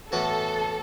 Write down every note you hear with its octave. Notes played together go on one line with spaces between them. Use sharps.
A2 E3 B3 F#4 A4 B4